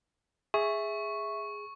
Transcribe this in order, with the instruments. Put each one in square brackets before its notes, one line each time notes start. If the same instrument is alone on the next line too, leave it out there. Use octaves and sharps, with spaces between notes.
[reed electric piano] G#4 [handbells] E5 [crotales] C#6